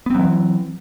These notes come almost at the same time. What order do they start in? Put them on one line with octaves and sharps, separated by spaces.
B3 C4 F#3 E3